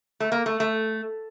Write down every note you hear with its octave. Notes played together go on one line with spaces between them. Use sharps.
A3
A#3
A3
A3